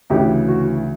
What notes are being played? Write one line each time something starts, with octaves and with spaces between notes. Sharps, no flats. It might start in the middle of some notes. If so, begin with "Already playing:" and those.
D2 C#3 E3 G4
F#4